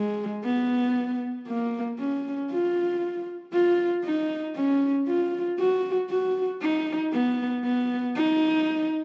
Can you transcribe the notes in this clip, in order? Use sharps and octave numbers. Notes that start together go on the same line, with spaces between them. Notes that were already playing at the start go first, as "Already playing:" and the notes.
Already playing: G#3
B3
A#3
C#4
F4
F4
D#4
C#4
F4
F#4
F#4
D#4
B3
B3
D#4